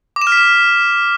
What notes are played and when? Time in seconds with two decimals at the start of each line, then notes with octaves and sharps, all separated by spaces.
0.16 D6
0.22 E7
0.27 F6
0.32 B6
0.37 E7